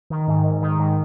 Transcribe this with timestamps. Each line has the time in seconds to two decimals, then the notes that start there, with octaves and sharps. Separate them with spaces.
0.10 D#3
0.28 G#2
0.45 G#2
0.62 D#3
0.79 G#2